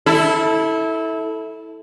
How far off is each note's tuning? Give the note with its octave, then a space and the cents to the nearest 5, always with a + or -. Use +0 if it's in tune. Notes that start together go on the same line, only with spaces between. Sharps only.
E4 -20 A4 +0